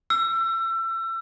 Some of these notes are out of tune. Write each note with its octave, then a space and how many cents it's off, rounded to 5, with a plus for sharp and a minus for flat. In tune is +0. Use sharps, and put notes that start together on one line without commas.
E6 +30